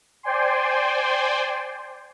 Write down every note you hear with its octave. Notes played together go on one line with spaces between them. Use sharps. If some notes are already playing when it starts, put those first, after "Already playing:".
C5 D5 G5 G#5 C6